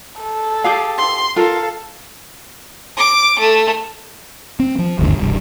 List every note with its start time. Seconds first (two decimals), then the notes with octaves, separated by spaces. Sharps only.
0.21 A4
0.64 G4 G#4 F5
0.98 C6
1.36 F4 A4 A#4 F5
2.98 D6
3.39 A3
4.60 C4
4.79 F3
4.99 G1 D#2 G#2 D3
5.18 E1 C2 G2